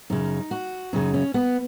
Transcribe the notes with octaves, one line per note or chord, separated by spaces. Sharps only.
F#2 C#3 D#4
F#4
F#2 C#3 D#4
C#4
B3